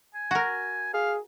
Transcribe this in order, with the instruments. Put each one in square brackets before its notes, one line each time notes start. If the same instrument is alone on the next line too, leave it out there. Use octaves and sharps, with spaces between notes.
[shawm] G#5
[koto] F#4 A#4
[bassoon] G#4 [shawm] F5